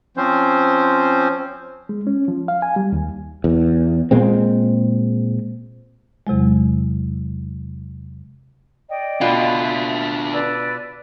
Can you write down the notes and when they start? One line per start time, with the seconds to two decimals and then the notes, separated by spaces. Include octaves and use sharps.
0.17 F3 C4 C#4 C5
1.89 G#3
2.07 C#4
2.28 F3
2.48 F5
2.62 G#5
2.76 G3
2.93 D#2
3.44 E2
4.11 A#2 G#3 C4
6.27 E2 C3 F#3 G#3
8.89 D5 D#5 G5
9.21 B2 D4 F4 F#4
9.60 E5
10.32 B4 D5 E6